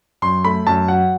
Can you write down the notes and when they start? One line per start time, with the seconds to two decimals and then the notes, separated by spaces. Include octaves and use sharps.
0.22 F#2 C6
0.44 A3 B5
0.67 F#2 A5
0.88 F#3 F#5